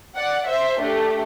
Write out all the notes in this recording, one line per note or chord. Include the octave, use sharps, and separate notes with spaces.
D5 F#5
C5 E5
A3 D4 G4